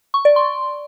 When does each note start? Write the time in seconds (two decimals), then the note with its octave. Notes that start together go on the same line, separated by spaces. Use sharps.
0.14 C#6
0.25 D5
0.36 C6